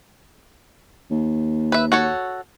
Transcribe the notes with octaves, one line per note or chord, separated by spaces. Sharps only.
D#2
B4 E5
F#4 A4 C#5